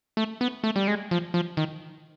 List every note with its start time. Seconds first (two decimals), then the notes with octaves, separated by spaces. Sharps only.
0.17 A3
0.41 B3
0.64 A3
0.76 G3
0.88 G#3
1.11 F3
1.34 F3
1.57 D#3